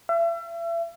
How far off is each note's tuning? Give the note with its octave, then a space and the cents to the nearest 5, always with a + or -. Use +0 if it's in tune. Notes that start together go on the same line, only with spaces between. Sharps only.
E5 +35